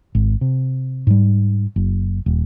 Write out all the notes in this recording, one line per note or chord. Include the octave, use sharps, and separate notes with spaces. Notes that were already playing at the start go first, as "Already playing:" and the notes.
G#1
C3
G#2 G3
F#1
D#1